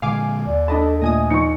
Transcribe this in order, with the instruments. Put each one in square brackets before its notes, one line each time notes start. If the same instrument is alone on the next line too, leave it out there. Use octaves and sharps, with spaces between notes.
[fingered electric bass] A#2 D3 G#3 [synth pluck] F5 G#5 D6
[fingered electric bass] D#2 [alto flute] D5
[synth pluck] D4 D#5 A5 [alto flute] A4 [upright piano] B5
[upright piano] A#2 [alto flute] A3 [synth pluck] D#5 G#5 D#6
[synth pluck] F3 D#4 [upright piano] C#6 C#7